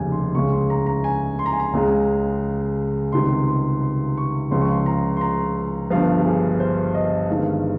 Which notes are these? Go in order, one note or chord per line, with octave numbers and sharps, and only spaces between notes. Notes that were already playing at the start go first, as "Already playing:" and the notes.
Already playing: F1 D#2 C#3 G3 G#5
C6
C#2 C#3 G#3 C#6
C6
A#5
A#5
G#5
C6
A#5
G#5
A#5
C#2 C#3 G#3
C#2 C3 D#3 G3 C6
C6
C6
C#6
C#2 C#3 F3 G#3 C6
C#6
C6
A#5
C6
A#5
G1 G2 F3 F5
G4
G#4
C5
D#5
G1 G2 D#3 G#3 F5